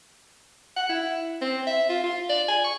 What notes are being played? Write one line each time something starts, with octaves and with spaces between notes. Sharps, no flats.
F#5
E4
C4
E5
F4
F4
D5
G#5
C#6